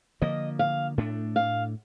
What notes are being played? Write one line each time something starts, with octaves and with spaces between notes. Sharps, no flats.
D3 F3 A#3 D#5
F5
A2 A3 D4
F5